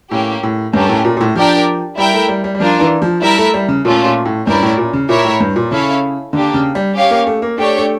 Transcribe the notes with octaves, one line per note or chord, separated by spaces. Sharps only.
A2 A#3 C#4 G4
A2
G2 A3 C#4 G4 A#4
A2
A#2
A#2
A2
F3 D4 G4 A#4 D5 G5
G3 E4 A#4 E5 G5
A3
G3
G3
G3
F3 D4 F4 A#4
E3
F3
G3 E4 A#4 E5 A5
A3
G3
C#3
A#2 A3 C#4 F4
A#2
A2
G2 C#4 E4 A#4 D5
A2
A#2
C#3
A#2 E4 A#4 C#5 E5
A2
G2
A#2
C#3 C#4 E4 A4 C#5 F5
D3 A#3 D4 G4
C#3
G3
C#4 G4 C#5 F5
A#3
A3
A#3
A3 D4 G4 C#5 G5
A3